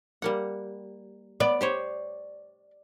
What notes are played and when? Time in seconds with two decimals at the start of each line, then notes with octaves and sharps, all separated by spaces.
0.22 G3 A#3 F#5
1.40 B3 D5
1.61 G4 C5 C#5